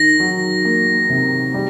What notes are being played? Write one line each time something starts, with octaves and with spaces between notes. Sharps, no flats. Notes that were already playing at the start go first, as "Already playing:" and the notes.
Already playing: D#3 A#6
F#3
A#3
C3
G3